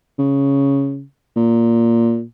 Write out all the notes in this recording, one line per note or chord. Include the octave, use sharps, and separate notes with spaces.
C#3
A#2